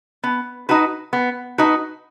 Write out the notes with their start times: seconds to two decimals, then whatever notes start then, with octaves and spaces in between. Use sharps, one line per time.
0.24 B3
0.69 D#4 F#4 B4
1.13 B3
1.58 D#4 F#4 B4